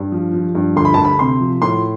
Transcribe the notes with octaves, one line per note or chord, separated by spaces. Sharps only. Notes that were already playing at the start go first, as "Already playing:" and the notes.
Already playing: G2
F3
F3
G2
D2 C6
B5
D2 A5
B5
C3 C6
F3
A2 C6